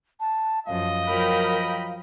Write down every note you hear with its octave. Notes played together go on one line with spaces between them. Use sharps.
A5
F#2 F3 D#5 F5
F3 F#3 A#4 G5 B5